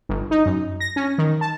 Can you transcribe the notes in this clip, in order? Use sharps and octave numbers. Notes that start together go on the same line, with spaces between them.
G1
D#4
F#2
A#6
C#4
D#3
A5